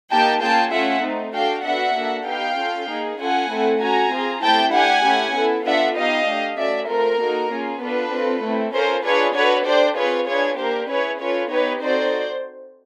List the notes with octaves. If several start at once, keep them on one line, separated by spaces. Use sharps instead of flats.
A#3 D#4 G4 G5 A5
A#3 C#4 F4 G#4 G5 A5
A3 C#4 F4 A4 E5 F#5
A3 C4 D#4
D4 F#4 A4 F5 G5
B3 D4 F#4 E5 F#5
A#3 D4 F#4 A4
B3 D#4 G4 F5 G5
C#4 F4 A4
A#3 D#4 G#4
C#4 F4 A4 F#5 G#5
A3 C4 E4 A4
C#4 F#4 A4 G#5 A#5
C4 F4 G#4
A3 C4 E4 G4 G5 A5
D4 G4 F#5 G#5
A3 C#4 E4 G4
B3 E4 A4
B3 D4 F4 A4 E5 F#5
B3 D#4 G4 D#5 F5
A3 D4 G4
A3 C#4 F#4 D5 E5
A3 C4 F4 A4 A#4
A#3 D#4 F#4 A4
A#3 C#4 F4 G#4
B3 D4 F4 A4 B4
C4 F4 A4
A3 C4 E4
C#4 F4 A4 A#4 C5
D4 F4 G#4 B4 C#5
D4 F#4 A4 B4 C#5
D4 G4 C5 D5
C4 F4 G#4 B4 C#5
D4 F4 G#4 B4 C#5
A#3 D4 G4 A#4 C5
C#4 E4 G#4 B4 C#5
C#4 F4 A4 B4 C#5
B3 D#4 G4 B4 C#5
C4 D#4 F#4 A4 C5 D5